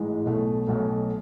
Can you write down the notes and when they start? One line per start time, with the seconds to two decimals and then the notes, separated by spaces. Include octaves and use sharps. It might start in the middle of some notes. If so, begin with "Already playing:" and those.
Already playing: A1 G#2 E3 G#3
0.26 B1 B2 F#3 A3
0.67 B1 B2 F#3 A3